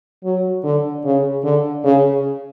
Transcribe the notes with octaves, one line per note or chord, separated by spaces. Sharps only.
F#3
D3
C#3
D3
C#3